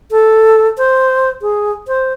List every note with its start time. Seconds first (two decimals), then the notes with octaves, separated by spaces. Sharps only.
0.11 A4
0.78 C5
1.42 G#4
1.88 C5